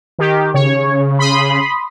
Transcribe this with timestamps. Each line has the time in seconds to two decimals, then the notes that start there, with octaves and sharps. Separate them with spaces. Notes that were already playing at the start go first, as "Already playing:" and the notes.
0.19 D#3 G4
0.54 C#3 C#5
1.19 B5 C6 D#6